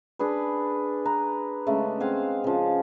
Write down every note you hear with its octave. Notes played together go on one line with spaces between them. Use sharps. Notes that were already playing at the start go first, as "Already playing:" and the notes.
D4 G#4 B4
B4 A#5
C#3 G#3 A3
C4 G#4 F5 F#5
C#3 F3